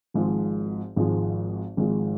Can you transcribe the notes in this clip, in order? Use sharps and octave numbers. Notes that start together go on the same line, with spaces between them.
G#1 G#2 F3 G#3
G#1 G#2 F3 G#3
G#1 G#2 F3 G#3